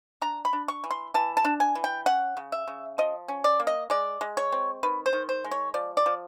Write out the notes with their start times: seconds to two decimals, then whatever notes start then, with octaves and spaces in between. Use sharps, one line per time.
0.21 D4 A#5
0.45 B5
0.53 D4
0.68 C#6
0.84 E3
0.91 C6
1.14 E3 A5
1.37 A5
1.45 D4
1.60 G#5
1.75 E3
1.84 G5
2.06 C#4 F#5
2.37 C#3
2.52 E5
2.67 C#3
2.98 F3 D#5
3.28 C#4
3.44 D5
3.60 A#3
3.67 D#5
3.90 G#3 D5
4.21 G#3
4.37 C#5
4.52 C4
4.83 D#3 B4
5.06 C5
5.13 D#3
5.29 C5
5.44 G#3
5.51 C#5
5.74 F3 D5
5.97 D5
6.06 F3